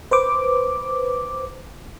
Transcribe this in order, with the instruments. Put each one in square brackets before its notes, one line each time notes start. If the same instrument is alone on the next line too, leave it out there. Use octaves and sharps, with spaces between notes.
[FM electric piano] B4 C5 D6